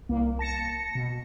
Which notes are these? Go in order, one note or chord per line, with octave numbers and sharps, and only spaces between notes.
C2 A#3
A5 A#6 C#7
B2